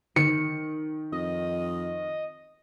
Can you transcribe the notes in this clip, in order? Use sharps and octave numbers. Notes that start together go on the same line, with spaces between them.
D#3 C#7
F2 D#5